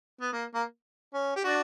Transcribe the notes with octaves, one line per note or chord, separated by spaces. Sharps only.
B3
A#3
A#3
C#4
G4
D4 F#4